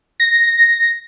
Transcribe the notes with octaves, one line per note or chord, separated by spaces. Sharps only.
A#6